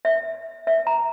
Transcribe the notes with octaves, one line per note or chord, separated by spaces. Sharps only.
E5
E5
A#5